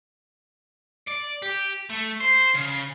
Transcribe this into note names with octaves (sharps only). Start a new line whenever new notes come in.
D5
G4
A3
C5
C#3